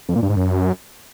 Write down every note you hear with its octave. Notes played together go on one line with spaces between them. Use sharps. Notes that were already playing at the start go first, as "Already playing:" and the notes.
F2
A#2
G2
G#2
F#2